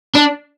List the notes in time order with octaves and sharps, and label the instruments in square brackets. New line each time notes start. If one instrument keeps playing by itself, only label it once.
[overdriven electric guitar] D4